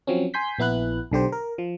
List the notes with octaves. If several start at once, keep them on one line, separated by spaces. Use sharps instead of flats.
F3 F#3 C4 C#4
G#5 C6 G6 B6
A#1 B3 E4 B4 F#6
B1 D3 G4 C5
A#4
F3